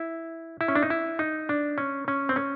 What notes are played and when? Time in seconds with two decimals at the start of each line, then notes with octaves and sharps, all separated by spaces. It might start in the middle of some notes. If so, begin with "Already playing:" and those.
Already playing: E4
0.61 E4
0.68 C#4
0.75 D4
0.83 D#4
0.90 E4
1.19 D#4
1.49 D4
1.78 C#4
2.08 C#4
2.29 C4
2.36 C#4